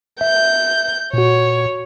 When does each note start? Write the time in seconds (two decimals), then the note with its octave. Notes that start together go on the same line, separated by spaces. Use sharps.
0.21 E5 G6
1.14 A#2 F#4 C#5